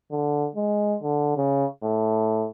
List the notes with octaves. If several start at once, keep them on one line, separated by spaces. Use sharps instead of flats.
D3
G#3
D3
C#3
A2